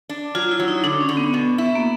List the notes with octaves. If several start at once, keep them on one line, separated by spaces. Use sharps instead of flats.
D4
F#3 F4
E4
F#3
D#4
D3 D4
C#4
D3
B3
B2 B3
E4
A#3